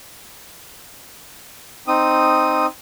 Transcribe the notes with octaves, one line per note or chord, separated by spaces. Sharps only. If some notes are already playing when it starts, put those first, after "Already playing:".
C4 D#4 D#6